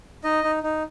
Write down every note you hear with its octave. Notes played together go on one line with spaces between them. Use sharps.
D#4 D#5
D#4
D#4